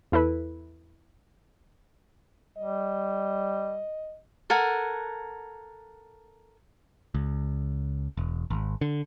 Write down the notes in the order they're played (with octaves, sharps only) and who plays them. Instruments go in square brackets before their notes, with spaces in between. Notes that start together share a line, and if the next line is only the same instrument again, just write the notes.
[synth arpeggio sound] E2 E4 A4 B4
[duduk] G3 [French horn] D#5
[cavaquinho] A4 A#4 F#5 G#5
[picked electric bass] C#2
E1
G#1
D3